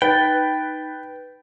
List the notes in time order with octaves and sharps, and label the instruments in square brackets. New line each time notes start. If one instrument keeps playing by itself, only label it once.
[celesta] D#4 A6 [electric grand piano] B4 [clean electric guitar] G5